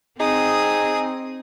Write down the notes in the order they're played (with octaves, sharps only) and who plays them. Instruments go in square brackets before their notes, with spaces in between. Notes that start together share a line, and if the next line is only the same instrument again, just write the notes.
[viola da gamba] C4 [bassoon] D#4 [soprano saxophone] G#4 [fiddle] D#6